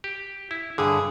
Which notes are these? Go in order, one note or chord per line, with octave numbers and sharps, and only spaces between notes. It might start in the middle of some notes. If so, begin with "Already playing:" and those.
G4
E4
G2 D3 G#4